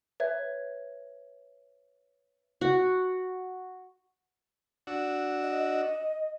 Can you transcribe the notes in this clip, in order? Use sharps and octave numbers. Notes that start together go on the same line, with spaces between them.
B4 C#5 E5 G#6
F#4
D4 F#4 E6
D#5